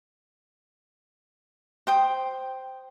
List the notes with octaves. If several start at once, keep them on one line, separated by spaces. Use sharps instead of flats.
C5 G5 D#6